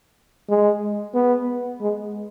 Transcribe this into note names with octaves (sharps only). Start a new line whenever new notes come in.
G#3
B3
G#3